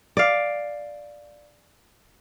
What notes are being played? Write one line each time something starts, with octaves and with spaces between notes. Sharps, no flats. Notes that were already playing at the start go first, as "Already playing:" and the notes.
D5 F5